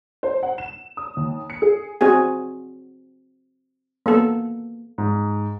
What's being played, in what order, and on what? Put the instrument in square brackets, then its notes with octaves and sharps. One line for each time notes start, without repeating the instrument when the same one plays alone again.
[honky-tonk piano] C5
F#5
E7
D#6
D#2
C#7
G#4
[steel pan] C4 F#4 G#4 G#5
A#3 B3 A4
[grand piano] G#2